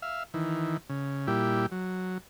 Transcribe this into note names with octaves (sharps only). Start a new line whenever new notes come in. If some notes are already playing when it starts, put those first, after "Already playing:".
E5 F5
D#3 E3
C#3
A#2 G3 E4 G4
F#3